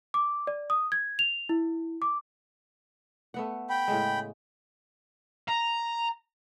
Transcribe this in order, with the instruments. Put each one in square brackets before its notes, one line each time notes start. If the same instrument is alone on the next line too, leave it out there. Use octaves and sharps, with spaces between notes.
[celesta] D6
D5
D#6
G#6
F7
E4
D6
[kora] A3 B3 F#5
[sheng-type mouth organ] G5 B5
[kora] A2 C#3 G#3
[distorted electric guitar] A#5